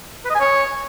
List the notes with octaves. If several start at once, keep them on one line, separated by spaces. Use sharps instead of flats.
B4
D#5
G#5
C#5